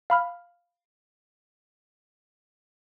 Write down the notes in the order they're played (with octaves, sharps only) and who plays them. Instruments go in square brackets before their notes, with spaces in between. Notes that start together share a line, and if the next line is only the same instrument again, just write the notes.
[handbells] F5 B5 F6